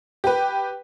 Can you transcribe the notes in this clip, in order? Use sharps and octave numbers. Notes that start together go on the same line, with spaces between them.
G4 B4